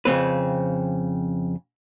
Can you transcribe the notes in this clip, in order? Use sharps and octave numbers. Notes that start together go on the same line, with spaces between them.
F2 C#3 C4 B4